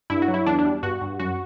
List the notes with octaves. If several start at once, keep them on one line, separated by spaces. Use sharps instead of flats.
G2 E4
F#4
F#3
E4
E2 D4
D4
G3
G2 F#4
G2
F#2 F#4